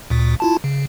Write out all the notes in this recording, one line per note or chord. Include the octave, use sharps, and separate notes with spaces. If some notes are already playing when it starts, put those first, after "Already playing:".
D2 A#2
E4 F4 A5
C#3